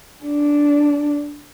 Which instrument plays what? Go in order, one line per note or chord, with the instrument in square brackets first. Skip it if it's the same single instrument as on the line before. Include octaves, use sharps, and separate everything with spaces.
[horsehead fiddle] D4